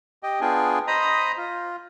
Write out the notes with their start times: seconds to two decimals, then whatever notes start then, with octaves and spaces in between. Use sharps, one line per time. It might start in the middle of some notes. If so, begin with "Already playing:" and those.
0.23 G4 D#5 G5
0.41 B3 D4 F4 G#4 G5 G#5
0.87 C5 D#5 A#5 B5 D#6
1.37 F4